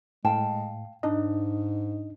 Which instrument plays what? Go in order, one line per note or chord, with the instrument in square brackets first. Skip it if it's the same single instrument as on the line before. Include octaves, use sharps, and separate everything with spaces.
[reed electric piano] A2 [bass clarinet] G#3 [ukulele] F5 G5 A5
[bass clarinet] G#2 [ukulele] D4 [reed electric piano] D#4 D#5